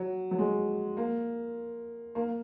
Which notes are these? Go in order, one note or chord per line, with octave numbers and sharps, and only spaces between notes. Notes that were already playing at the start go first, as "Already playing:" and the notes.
Already playing: F#3
F#3
G#3
A#3
A#3